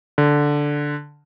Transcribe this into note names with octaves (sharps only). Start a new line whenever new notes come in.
D3